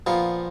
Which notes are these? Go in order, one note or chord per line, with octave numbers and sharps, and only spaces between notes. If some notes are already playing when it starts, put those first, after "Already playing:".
A#2 F3 B3 F4